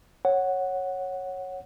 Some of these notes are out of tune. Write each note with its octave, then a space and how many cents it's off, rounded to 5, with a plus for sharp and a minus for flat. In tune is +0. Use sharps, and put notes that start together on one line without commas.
C#5 -10 F#5 +0